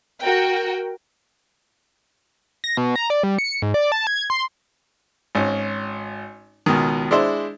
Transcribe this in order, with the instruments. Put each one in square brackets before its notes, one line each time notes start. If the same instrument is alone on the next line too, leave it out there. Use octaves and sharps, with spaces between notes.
[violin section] F#4 A#4 G5
[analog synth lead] A#6
B2
A#5
D5
G3
C#7
G#2
D5
A5
G#6
C6
[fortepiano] G#1 C#4
C#2 B2 D#3
G#3 D4 E4 C5